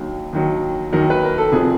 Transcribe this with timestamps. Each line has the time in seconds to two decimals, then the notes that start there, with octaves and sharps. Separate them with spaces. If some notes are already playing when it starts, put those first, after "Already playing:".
Already playing: D#2 D#3 F#3
0.33 D#2 D#3 F#3
0.92 D#2 D#3 F#3 A#4
1.10 B4
1.24 A#4
1.38 A4
1.52 F1 F2 C3 F3 G#4